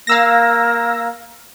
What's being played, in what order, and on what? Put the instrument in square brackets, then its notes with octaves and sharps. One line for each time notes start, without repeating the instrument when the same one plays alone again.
[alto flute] A#3 [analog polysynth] F5 E6 A#6